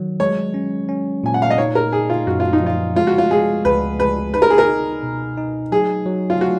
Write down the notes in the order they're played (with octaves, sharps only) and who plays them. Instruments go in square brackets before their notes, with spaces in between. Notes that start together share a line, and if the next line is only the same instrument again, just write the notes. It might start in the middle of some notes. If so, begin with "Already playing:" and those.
Already playing: [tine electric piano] D#3 F#3
[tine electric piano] G#3 [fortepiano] C#5
[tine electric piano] C#4
C#4
[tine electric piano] A#2 [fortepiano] G#5
[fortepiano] F#5
F5
D#5
[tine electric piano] D#4 [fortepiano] C#5
[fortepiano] A#4
[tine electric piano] D#4 [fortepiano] G#4
[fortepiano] F4
[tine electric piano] F#2 [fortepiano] F#4
[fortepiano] F4
D#4
[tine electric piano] F3 [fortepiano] F4
[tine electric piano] G#3 [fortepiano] F4
[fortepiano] F#4
F4
[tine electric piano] G#3 [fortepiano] G#4
[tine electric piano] C#2 [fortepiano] B4
[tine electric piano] G#3 [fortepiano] B4
[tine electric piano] D#4 [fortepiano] B4
[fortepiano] A#4
G#4
A#4
[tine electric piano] D#4
B2
D#4
[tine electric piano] F#3 [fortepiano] G#4
[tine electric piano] F#3
[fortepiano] F4
F#4